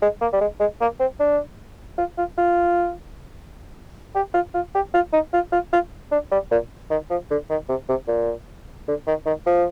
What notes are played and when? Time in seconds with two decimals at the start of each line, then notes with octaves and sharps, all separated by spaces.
0.02 G#3
0.21 A#3
0.33 G3
0.41 G#3
0.60 G#3
0.81 A#3
1.00 C4
1.20 D4
1.98 F4
2.18 F4
2.38 F4
4.15 G4
4.34 F4
4.54 F4
4.74 G4
4.94 F4
5.13 D#4
5.33 F4
5.52 F4
5.73 F4
6.11 D4
6.31 G3
6.51 A#2
6.90 D#3
7.10 F3
7.30 D3
7.50 D#3
7.69 C3
7.89 C3
8.08 A#2
8.88 D3
9.07 D#3
9.26 D#3
9.46 F3